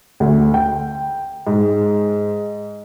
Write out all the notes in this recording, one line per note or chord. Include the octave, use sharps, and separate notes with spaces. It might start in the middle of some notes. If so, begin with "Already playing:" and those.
D2
G5
G#2